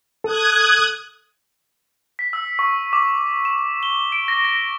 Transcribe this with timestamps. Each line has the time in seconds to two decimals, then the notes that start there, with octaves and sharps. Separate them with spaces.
0.24 A4 D#6 F#6 G#6
2.19 B6
2.33 E6
2.59 C#6
2.93 D6
3.45 E7
3.83 G7
4.12 D7
4.28 A#6
4.45 A#6